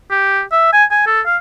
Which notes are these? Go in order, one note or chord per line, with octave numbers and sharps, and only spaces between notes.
G4
E5
G#5
G#5
A4
F5